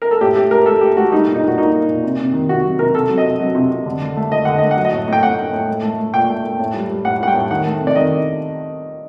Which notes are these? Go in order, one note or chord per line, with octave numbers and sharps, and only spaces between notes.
A#4
A4
A2 G4
A3 G4
A3 A#4
A3 A4
A3 G4
A3 F#4
G3 D#4
A#2
D#4
A#2
F#4
A#3 D#4
A#3
A#2
C3
C3
D#3
C3 F#4
F#3
C3 A#4
C3 A4
F#3
D#5
C3
F#3
C3
C3
D3
D3
A3
D3 D#5
D3 F#5
A3 D#5
F#5
F#3
D#5
A2
A2 G5
A2 F#5
A2
A2
A3
A3
A3
A#2 G5
A3
A3
A2
G3
G3
A2 F#5
G3 F#5
G5
A2
D#3 F#5
A3
C3
D5
D#3 D#5